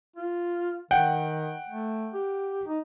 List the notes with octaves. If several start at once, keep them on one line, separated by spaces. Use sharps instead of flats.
F4
D#3 F#5 G5
A3
G4
D#4